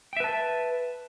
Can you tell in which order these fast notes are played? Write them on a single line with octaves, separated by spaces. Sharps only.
G5 E5 B4 A5